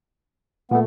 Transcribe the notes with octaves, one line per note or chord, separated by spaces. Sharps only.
A#2 A3 B3